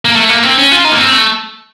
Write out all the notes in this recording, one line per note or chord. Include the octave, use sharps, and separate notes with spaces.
A#3
A3
A#3
C4
C#4
F4
D#4
A#3
C4
A3